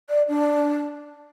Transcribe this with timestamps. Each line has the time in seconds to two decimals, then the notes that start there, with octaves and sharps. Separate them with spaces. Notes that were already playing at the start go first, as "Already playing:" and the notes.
0.09 D5
0.28 D4